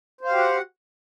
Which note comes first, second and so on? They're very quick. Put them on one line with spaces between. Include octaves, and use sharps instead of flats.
C5 F5 G4 F#4 F#5